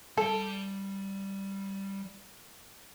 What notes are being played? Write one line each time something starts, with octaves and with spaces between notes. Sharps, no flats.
G3 A4 D5